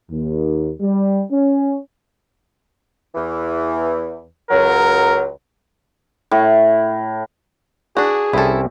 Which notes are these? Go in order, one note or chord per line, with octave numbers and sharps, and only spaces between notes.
D#2
G3
C#4
E2 E3
C#2 F#3 A#4
A2
D4 F#4 G#4
C2 C4 C#4 E4 A4